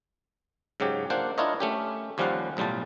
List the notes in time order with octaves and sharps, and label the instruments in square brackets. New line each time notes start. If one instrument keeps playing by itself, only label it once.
[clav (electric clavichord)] G#2 C#3 F#3 G4
A#3 D4 F4 C5 F#5
D4 E4 F4 A#4 C#5 D#5
A3 C#4 G4
D#2 F3 G3 C#4 F5 F#5
B1 A2 G3 F4 A5